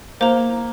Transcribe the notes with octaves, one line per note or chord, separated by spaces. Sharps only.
A#3 C5 A#5